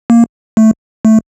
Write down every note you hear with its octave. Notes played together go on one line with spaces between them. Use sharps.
A#3
A3
A3